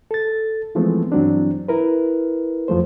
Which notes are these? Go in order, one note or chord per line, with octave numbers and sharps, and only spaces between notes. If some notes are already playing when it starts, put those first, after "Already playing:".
A4 A6
E3 F3 G#3 A3 B3 C4
G2 E3 F#3 C4 D4
E4 A#4 B4
F2 F3 F#3 A3 C5